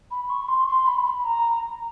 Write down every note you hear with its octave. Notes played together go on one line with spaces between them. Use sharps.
B5
C#6
C6
C6
B5
B5
A#5